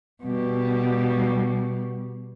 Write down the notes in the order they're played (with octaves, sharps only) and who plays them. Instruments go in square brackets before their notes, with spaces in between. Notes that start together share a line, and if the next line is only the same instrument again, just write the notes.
[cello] B2 G3